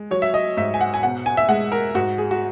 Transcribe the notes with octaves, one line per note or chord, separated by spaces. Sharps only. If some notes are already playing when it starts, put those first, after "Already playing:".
Already playing: G#3
F#3 C#5
E5
D#5
G#2 E5
G#5
F#5
G#5
B2 F#5
G#5
E5
G#3 F#5
A#4
G#2 F#4
G#4
F#4